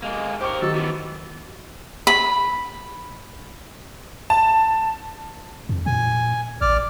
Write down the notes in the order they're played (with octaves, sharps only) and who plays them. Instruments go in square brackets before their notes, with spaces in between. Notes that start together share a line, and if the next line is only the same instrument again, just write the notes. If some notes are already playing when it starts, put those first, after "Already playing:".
[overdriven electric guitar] G#3 A#3
[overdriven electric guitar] G4 A#4 [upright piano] C5 C#6
[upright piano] D#3 F#3 G4 [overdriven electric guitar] A4
[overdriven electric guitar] E3 B3
[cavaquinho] B5
[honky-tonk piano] A5
[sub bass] F2
[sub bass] A#2 [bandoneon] G#5
[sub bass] A1 [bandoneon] D5 D6 F6